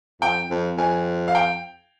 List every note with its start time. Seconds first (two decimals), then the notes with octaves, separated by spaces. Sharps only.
0.21 F2 G5
0.50 F2
0.78 F2 G#5
1.28 F5
1.35 G5